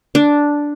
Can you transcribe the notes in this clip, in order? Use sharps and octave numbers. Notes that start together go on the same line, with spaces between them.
D4